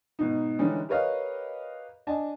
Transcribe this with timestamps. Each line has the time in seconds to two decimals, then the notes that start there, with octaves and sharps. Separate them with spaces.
0.19 G#2 B2 D#4
0.59 D3 E3 G3 G#3 C#4 D#4
0.89 G4 A#4 B4 C#5 D#5 F5
2.07 D4 D#5 G#5 A5